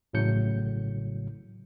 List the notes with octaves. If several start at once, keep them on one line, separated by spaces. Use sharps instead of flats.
A1 A2 C#3 F#3 G6 C#7